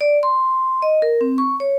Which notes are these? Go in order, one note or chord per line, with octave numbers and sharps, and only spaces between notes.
D5
C6
D#5
A#4
C4
C#6
C#5